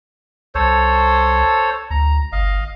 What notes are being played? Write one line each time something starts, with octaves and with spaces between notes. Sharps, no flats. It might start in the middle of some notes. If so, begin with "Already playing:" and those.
C2 A4 C5 C#5
D2 A#5
G1 D#5 F5